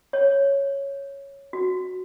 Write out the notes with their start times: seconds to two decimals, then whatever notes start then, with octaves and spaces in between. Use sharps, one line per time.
0.13 C#5
1.53 F#4